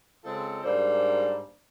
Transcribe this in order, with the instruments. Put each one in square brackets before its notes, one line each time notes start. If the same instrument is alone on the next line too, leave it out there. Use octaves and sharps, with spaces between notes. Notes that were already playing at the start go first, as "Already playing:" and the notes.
[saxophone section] C#3 G#3 C4 F4 A4
G#2 G3 A#3 D4 C5